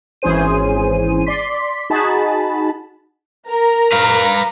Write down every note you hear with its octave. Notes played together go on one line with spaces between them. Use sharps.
G#1 E3 C#4 G#4 C5 D#7
D5 C6 B6
D#4 F#4 G#4 A5 B5
A#4 A#5
B4 F5